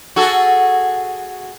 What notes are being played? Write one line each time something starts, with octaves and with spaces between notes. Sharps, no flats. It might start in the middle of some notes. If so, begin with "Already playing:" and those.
F#4 G#4 A4